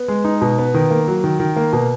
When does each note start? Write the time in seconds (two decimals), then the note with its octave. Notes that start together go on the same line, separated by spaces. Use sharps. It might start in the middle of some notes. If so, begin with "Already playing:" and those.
Already playing: B3
0.08 G#3
0.24 D#4
0.42 B2
0.58 B3
0.74 D#3
0.91 A#3
1.08 F#3
1.24 D#3
1.40 D#3
1.56 A#3
1.73 B2